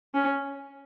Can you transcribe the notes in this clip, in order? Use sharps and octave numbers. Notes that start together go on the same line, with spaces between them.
C#4